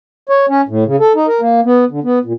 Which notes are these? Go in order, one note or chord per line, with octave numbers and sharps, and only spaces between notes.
C#5
C#4
A2
C#3
A4
D#4
A#4
A#3
B3
D3
B3
A#2